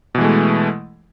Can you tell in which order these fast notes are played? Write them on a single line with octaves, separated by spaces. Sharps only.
B2 E3 G#3 A3